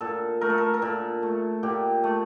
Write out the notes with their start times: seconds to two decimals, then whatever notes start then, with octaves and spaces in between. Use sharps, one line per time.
0.01 A#2 A4
0.41 A3 A#4
0.50 A4
0.58 A#4
0.74 A#4
0.82 A#2 A4
1.22 A3
1.63 A#2 G4
2.04 A3